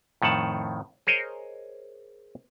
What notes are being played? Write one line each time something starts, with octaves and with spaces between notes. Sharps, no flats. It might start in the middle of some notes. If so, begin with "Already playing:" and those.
F2 A2 D#3 F#5 A5
G#4 A#4 C5 C#5 D#5